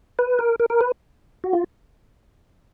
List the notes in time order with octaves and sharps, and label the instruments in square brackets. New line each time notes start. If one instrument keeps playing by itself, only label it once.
[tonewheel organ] B4
A#4
A#4
A#4
B4
F#4
F4